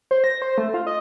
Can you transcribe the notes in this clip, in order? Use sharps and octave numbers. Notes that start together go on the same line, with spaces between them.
C5
A#6
C5
A3
F4
D#5